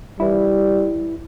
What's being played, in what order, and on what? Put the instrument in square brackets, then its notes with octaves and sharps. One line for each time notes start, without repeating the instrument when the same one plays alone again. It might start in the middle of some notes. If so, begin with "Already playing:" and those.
[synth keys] E3 E4 [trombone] G3